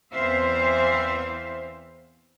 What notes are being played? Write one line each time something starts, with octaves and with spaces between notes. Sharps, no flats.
E2 E3 C4 C5 E5 F5